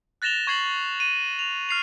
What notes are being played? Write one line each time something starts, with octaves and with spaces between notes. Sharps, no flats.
F#6 A6 A#6 E7 F7 G7
C#6 G#6 C7 F#7 G7
D#7
F7
F6 C7 F7